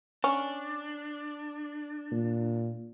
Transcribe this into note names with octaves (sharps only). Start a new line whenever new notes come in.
C#4 D4
A#2